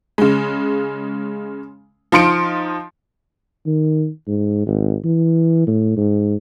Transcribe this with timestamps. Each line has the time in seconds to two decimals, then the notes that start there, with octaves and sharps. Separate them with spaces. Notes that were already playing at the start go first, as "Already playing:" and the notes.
0.18 C#3 G#3
2.12 F3 D#4 C6 C#7 D7
3.66 D#3
4.28 G#2
4.66 G#1
5.04 E3
5.67 A2
5.97 G#2